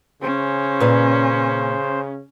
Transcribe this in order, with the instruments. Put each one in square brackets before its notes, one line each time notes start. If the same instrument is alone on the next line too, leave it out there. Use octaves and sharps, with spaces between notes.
[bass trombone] C#3 [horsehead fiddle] C#4 [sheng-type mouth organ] C5
[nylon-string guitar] A#2 B4